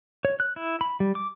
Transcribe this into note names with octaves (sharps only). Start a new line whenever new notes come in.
C#5
F#6
E4
B5
G3
D6